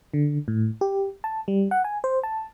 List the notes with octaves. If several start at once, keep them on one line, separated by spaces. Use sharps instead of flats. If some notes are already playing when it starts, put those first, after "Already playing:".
D3
A2
G4
A5
G3
F#5
G#5
C5
A5